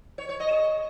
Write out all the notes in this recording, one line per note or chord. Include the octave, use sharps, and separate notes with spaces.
C#5
C#5
D#5
G#4